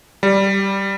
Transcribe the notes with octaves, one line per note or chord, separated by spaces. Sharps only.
G3